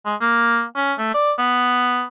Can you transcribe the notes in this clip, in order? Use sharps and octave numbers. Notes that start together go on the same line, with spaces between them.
G#3
A#3
C#4
A3
D5
B3